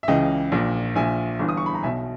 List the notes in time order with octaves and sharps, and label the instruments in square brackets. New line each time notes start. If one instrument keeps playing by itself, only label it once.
[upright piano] E5
C#2 C#3 E3 D#5 G5
A#1 A#2
A#1 A#2 E5 G#5
G1 G2 E3
D#6
C#6
B5
A#5
B1 B2 E5 G#5